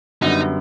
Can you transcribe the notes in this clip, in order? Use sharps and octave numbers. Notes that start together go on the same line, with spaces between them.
F#2 D3 G3 B3 D#4